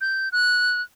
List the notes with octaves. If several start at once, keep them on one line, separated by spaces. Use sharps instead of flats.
G6
F#6